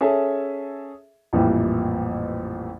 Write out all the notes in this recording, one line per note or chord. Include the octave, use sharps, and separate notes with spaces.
C#4 G#4 A4 E5
A1 F2 A#2 E3 G3